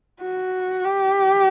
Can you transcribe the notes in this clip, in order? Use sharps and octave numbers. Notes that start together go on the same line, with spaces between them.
F#4
G4